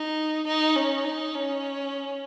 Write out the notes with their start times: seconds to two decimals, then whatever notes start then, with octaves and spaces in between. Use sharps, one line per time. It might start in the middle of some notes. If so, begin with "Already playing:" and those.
Already playing: D#4
0.47 D#4
0.76 C#4
1.05 D#4
1.34 C#4